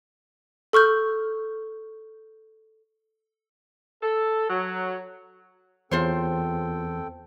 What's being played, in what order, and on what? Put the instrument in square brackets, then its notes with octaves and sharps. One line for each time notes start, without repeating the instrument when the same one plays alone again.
[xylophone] A4 C#6 F6 G6
[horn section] A4
F#3
[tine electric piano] E2 [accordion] C4 A4 G5 [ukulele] F4 C5 C#5